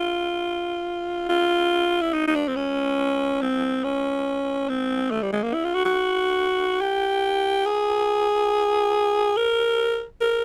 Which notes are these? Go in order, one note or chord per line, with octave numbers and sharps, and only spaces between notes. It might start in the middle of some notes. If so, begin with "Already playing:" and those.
Already playing: F4
F4
E4
D#4
D#4
D4
C4
C#4
C4
C#4
C4
A3
G3
G#3
A#3
E4
F4
F#4
F#4
G4
G#4
A#4
A#4